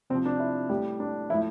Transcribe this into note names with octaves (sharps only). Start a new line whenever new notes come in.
C3 F3 C4
D4
E4
A2 G3 G4
D4
A2 F3 E4